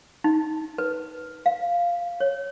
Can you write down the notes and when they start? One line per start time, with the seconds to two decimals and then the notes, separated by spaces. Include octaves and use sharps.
0.24 D#4
0.78 B4
1.46 F5
2.20 C#5